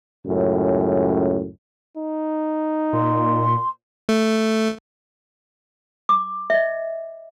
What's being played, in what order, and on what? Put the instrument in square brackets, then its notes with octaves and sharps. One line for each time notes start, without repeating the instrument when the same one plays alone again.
[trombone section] C#2 F#2 A2
[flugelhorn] D#4
[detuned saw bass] A#2 [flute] C6
[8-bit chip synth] A3
[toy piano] D6
D#5 E5